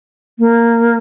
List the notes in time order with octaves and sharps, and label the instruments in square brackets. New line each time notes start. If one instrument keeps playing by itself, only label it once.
[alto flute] A#3